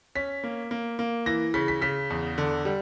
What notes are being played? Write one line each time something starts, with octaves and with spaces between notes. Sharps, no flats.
C#4 B6
A#3
A#3
A#3
E3 A#6
C#3 B6
B6
C#3 B6
E2
D3
G3